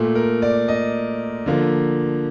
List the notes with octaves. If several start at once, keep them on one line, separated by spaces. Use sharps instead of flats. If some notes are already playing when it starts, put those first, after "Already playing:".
Already playing: A#2 A3
A#4
D5
D#5
D3 F3 A#3